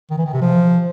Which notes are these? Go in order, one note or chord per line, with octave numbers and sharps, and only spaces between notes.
D#3
E3
D#3
C3
F3